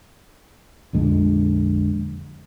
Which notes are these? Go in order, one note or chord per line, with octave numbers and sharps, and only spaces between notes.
A#1 F2 D3 G#3